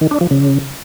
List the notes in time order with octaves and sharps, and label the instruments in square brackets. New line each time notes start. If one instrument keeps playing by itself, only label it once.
[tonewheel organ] D#3
D4
F3
C#3